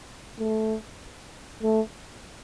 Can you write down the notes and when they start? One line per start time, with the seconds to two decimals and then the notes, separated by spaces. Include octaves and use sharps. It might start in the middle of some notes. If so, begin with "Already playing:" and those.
0.40 A3
1.63 A3